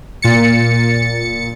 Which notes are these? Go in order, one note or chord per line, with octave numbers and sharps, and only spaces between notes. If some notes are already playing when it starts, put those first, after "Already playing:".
A#2 A6 C#7